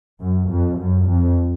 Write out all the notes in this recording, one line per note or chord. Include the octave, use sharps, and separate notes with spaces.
F#2
F2
F#2
F2